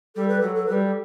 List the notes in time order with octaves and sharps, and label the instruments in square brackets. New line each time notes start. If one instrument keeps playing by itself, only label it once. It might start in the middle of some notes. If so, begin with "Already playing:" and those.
[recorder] G3 [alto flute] A4
[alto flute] B4
[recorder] F#3 [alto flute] A4
[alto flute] A4
[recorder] G3 [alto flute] B4
[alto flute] A4